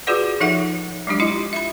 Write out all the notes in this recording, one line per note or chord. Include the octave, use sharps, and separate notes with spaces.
F4 F#4 G#4 B4 D5 F#5
F3 D#4 A4 E5 F#5
F#3 G#3 D4 G4
E4 F4 D#5
E5 B5